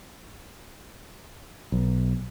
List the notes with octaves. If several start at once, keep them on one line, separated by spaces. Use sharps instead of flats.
B1